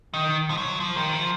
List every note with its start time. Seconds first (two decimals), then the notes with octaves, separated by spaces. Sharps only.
0.14 D#3
0.50 F3
0.57 F#3
0.80 F3
0.96 D#3
1.13 F3